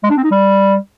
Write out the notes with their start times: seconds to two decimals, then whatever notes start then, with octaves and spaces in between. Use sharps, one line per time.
0.03 G#3
0.10 D4
0.17 C4
0.24 D#4
0.31 G3